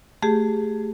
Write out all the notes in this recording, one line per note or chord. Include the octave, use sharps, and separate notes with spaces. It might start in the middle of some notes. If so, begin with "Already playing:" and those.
A3 G4 G#4